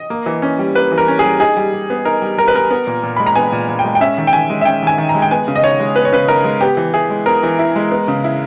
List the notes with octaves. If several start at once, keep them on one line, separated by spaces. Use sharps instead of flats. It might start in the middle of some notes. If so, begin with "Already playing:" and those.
Already playing: D#5
A#3
E3
C#4
G3
A#3 B4
E3
A#4
C#4
G#4
G3
D#4 G#4
G3
G3
B3
D#4 A#4
G3
G3 A#4
B4
B3 A#4
B3
A#2
A#2
G#3 B5
A#5
B3 G#5
A#2
A#2
G5
G#3
G5
C#4 E5
D#3
G5
D#3 G#5
G#3
E5
C#4 G5
D#3 G#5
D#3
A#5
G#3
G5
B3 G#5
C#3
D#5
D#4 C#5
G#3
B3 B4
C#5
C#3 B4
D#4 A#4
G#3
B3 G4
E3
E4 G#4
G#3
B3 A#4
E3
E4
G#3
B3
C#3
E4